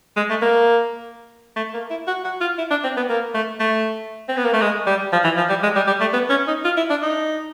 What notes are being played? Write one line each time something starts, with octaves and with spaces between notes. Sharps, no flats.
G#3
A3
A#3
A3
A#3
E4
F#4
F#4
F4
E4
D4
C4
B3
A#3
A3
A3
C4
B3
A#3
A3
G#3
G3
F3
E3
F3
G3
G#3
G3
G3
A3
B3
C#4
D#4
F4
E4
D4
D#4